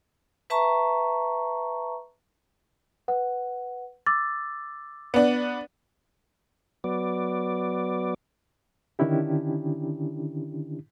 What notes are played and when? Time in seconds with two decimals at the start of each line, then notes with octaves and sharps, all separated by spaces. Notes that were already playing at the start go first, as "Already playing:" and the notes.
0.50 B4 E5 A5 A#5 C#6
3.08 B4 F#5
4.06 D6 E6 A6
5.14 B3 D4
6.84 F#3 B3 D5
8.99 D3 D#3 C#4 D4 E4 G4